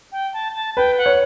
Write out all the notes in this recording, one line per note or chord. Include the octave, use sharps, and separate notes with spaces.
G5
A5
A5
B4 G5
F#5
C#5